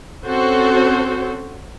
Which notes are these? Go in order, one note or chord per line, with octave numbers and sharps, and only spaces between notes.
C4 C#4 F#4 A4 C5